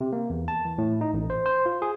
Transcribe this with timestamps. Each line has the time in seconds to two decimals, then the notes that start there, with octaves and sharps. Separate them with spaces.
0.01 C3
0.12 A#3
0.30 E2
0.48 A5
0.65 E3
0.78 A2
1.01 D#4
1.14 A1
1.30 C5
1.46 C5
1.66 F4
1.82 G#4